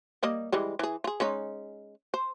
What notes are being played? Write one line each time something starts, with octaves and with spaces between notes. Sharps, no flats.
G3 A#3 D#5
E3 G3 G#3
E3 G#4
F4 G#4
G#3 C#4 D#4
C5